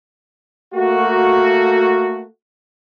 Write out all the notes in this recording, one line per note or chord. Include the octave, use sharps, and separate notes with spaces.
A3 A#3 F#4